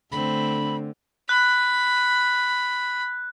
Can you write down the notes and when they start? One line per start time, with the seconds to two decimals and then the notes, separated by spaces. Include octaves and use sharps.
0.12 D3 A3 C4 B5
1.29 B5 F#6